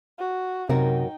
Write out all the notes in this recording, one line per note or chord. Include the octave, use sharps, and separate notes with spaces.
F#4
F#2 C3 D#4 F#4 A#4 G5